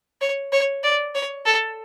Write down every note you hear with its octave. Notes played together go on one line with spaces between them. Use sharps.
C#5
C#5
D5
C#5
A4